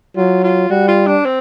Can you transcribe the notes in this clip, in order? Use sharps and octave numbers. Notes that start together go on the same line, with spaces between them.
F#3 F4
F4
G3 F#4
F4
D4
C4